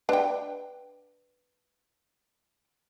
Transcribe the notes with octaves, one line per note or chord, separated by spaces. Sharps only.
D4 B4 G5